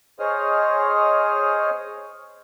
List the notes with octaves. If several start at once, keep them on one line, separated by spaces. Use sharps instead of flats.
G#4 C5 C#5 D#5 D#6 F6